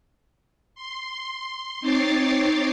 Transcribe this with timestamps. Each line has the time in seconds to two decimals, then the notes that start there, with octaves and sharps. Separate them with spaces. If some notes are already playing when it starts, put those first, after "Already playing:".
0.75 C6
1.81 C4 D#4 C#5 D6 A6 C7